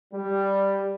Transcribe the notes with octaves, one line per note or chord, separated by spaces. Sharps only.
G3